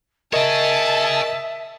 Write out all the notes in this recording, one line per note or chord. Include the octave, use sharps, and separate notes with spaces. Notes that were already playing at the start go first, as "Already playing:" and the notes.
G#4 A#4 C#5 D#5 E5 A5